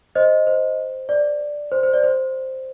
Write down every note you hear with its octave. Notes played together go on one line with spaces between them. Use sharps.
C5 D#5
C5
D5
C5
C5
D5
C5